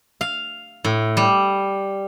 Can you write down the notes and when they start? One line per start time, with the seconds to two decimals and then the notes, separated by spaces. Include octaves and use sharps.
0.21 F5
0.84 A2
1.17 G3